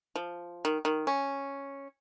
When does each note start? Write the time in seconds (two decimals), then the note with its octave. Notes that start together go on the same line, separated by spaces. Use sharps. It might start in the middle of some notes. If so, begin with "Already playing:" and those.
0.16 F3
0.65 D#3
0.85 D#3
1.07 C#4